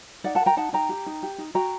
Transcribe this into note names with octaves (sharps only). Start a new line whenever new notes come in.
D#4 D5 F#5
F#5 A5
A#4
G5 A#5
D#4 F#5 A5
D#4 G5 A#5
G4
D#4
G4
D#4
F#4 G5 A#5